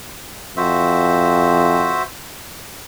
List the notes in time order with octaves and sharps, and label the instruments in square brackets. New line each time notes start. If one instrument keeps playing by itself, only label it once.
[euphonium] F2 [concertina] F#4 C5 E5